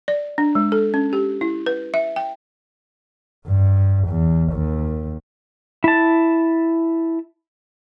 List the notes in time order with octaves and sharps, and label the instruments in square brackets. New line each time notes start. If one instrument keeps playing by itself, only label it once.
[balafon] D5
D4
G#3
A4
C#4
G4
E4
B4
E5
G5
[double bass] G2
E2
D#2
[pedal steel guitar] E4 A5